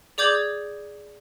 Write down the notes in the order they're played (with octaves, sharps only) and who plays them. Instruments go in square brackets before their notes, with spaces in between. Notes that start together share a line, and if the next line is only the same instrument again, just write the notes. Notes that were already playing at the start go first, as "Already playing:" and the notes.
[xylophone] G#4 D5 D6 G6 G#6 F#7